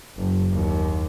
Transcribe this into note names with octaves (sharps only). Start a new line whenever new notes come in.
F#1
D#2